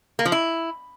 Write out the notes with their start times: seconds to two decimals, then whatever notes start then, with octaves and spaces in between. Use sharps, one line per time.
0.19 A#3
0.25 F3
0.32 E4